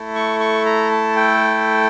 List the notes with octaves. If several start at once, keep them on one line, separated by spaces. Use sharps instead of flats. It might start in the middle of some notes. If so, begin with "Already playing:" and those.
Already playing: A3 E4 A4
C#6
C#6
A#5
A5
G5